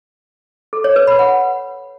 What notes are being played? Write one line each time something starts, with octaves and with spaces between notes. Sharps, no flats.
A4
C#5
B4
B5
F#5